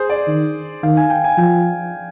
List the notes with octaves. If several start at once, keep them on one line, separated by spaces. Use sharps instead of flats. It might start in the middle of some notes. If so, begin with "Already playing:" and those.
Already playing: G#4 C5
D5
D#3
D#3 F5
G#5
G5
G#5
F3 G5